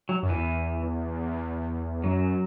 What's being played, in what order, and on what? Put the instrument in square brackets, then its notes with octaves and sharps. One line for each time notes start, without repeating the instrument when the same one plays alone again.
[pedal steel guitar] F#3
[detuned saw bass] F#2
[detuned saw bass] E2 [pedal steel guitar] E3
[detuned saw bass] F#2 [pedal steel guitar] F#3